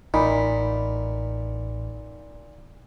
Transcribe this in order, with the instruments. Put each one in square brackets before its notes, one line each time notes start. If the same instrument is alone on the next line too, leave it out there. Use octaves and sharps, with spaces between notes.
[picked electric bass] A1 [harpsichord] A#2 [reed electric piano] D#4 [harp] B5